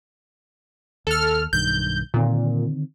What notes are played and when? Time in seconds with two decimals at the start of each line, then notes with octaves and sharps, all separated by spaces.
1.07 D#2 A4 F6
1.53 B1 G2 D#3 G6
2.14 A#2 D3 D#3 C4